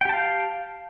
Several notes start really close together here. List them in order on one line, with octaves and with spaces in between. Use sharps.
G5 G4 A5 F5